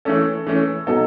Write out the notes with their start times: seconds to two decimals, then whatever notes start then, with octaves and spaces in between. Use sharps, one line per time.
0.05 E3 A3 C#4 A4
0.46 E3 A3 C#4
0.87 B2 F#3 B3 D#4 A4